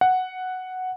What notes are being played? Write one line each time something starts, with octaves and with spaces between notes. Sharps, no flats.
F#5